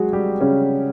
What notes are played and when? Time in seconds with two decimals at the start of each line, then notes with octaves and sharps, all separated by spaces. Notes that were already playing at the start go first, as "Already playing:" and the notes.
Already playing: F#3 G#3 F#4 G#4
0.13 G3 G4
0.41 C#3 C#4